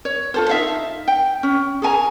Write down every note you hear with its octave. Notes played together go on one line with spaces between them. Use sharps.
C#5
F4 A4 C5
D#4 E5 F5
G5
C#4
G#4 A4 G#5 A#5